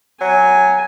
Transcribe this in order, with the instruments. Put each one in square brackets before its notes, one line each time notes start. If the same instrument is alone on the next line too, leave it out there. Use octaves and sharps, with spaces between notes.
[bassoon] F#3 [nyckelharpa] G#5